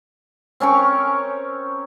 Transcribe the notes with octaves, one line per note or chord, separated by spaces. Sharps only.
C4 C#4 A#4 C#6